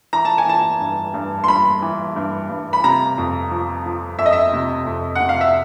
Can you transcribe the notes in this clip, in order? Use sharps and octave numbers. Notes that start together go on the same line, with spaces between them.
E3 A#5
A5
G#5
E3 A5
G2
G2
C6
G2 B5
E3
G2
G2
B5
C3 A#5
F2
F3
F3
F2 E5
D#5
E5
C3
F2
C3 F#5
F5
E5